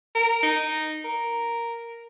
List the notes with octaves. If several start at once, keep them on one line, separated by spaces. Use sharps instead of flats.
A#4
D#4
A#4